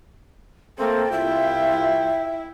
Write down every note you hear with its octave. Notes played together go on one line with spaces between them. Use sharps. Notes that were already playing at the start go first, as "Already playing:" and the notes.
A3 A#3 C4 A4 G5
C2 E4 F4 E5